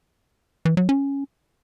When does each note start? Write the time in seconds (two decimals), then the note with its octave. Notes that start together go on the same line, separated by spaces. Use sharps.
0.65 E3
0.77 F#3
0.89 C#4